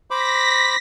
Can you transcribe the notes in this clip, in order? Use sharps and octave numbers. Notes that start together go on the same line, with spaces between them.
C5 B5 D6 A#6 B6